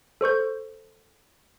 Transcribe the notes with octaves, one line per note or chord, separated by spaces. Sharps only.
A4 C5 C#6 G6